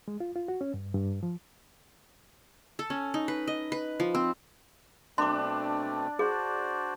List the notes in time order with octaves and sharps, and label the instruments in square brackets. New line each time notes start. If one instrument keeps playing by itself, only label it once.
[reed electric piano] G#3
F4
F4
F#4
C#4
G2
G2
F3
[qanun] A4
C#4
D#4
B4
D#5
B4
F3
C4
[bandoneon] B2 A3 C4 [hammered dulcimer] D4 [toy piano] C6 D6
[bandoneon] F#4 C5 D5 [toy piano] G#4